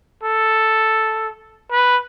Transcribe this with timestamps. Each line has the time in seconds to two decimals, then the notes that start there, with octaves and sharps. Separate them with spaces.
0.23 A4
1.72 B4